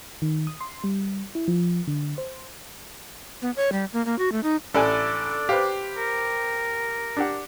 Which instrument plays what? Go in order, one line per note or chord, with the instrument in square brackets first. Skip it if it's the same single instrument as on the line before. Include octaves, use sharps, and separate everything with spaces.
[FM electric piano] D#3
D#6
C6
G3
E4
F3
D3
C5
[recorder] B3
C#5
G3
A#3
A#3
F#4
A3
D#4
[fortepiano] A1 G#5 [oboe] D4 [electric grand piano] A4 D5
[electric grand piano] G4 [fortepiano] B4 C5 F5
[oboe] A#4
[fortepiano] D4 G4 F#5